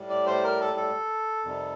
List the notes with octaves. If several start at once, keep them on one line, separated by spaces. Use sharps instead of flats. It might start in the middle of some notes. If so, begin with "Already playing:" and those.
Already playing: A2 G3
D5
C5
A#4
A4
A4
F2 C3 D#3 G3